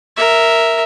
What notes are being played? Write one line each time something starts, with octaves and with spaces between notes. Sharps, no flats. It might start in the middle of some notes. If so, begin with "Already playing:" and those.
A#4 E5